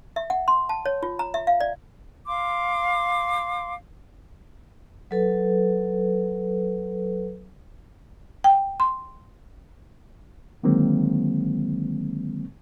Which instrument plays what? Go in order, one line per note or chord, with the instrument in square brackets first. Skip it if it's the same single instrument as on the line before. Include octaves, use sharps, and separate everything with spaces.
[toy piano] E5
F#5
C6
A5
C#5
F4
A#5
E5
F5
D5
[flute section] F5 C6 D6
[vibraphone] F#3 A4 B4
[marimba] G5
C6
[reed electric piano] D3 D#3 F#3 G#3 A#3 C4